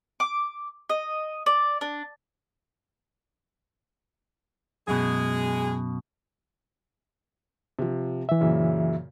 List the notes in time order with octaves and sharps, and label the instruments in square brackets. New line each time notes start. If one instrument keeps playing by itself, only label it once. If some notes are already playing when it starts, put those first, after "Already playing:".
[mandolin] D6
D#5
D5
D4
[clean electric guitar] F#2 B2 [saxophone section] G#3 G#4
[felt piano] C3 F3
[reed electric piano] E3 E5
[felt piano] F#2 A#2 C#3